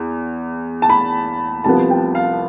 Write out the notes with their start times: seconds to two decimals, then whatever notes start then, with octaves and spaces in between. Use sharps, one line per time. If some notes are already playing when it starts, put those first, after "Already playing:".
Already playing: E2
0.82 A5
0.90 B5
1.64 C2 C3 F3 B3 A5
1.90 G5
2.15 F5